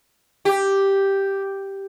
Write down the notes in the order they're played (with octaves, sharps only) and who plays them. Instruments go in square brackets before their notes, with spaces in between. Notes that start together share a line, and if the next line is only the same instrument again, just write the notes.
[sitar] G4